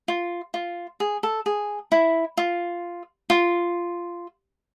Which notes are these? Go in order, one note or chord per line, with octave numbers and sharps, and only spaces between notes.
F4
F4
G#4
A4
G#4
E4
F4
F4